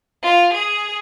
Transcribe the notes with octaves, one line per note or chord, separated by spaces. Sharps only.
F4
G#4